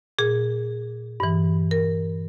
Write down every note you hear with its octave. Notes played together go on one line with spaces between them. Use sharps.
A#2 G#4
G2 E3
A#4